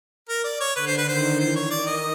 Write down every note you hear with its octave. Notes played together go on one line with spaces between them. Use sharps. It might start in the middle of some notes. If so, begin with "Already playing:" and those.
A#4
D5
C#5
D3 B4
C5
B4
D#3 C5
E3 C5
C#5
D#3 D5
D#5